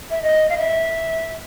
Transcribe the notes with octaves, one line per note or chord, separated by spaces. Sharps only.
E5
D#5
F5
E5